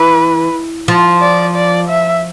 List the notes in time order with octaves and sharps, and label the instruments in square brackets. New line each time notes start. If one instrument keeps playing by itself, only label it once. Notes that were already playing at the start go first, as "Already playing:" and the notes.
Already playing: [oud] E3 [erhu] B4
[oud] F3
[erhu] D5
D5
E5